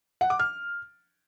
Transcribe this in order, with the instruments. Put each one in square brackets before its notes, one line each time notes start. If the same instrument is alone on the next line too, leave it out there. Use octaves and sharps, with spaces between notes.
[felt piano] F#5
D6
F6